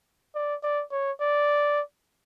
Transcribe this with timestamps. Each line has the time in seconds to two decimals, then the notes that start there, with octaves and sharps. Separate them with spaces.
0.35 D5
0.63 D5
0.92 C#5
1.21 D5